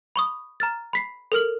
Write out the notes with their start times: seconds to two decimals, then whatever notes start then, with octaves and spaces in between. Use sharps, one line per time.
0.16 B5 C#6 D#6
0.60 A#5 F6 A6
0.93 B5 B6 C7
1.32 A4 A#4 F6 F#7